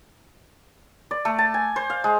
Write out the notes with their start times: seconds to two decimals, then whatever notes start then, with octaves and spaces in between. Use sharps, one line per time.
1.11 D5
1.25 A3
1.38 A5
1.54 G#5
1.76 C5
1.90 F5
2.04 G#3